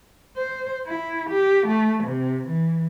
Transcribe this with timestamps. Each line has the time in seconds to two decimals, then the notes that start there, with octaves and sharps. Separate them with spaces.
0.37 C5
0.86 E4
1.30 G4
1.67 A3
2.03 C3
2.48 E3